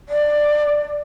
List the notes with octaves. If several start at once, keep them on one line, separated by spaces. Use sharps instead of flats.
D5